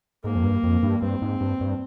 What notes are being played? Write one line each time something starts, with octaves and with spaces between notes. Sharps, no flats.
G#2 A#3
F2
G2
F2
G2
G2 C4
G#2
G2
G2